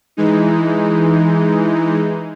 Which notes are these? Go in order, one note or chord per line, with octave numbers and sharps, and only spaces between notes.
E3 G#3 D#4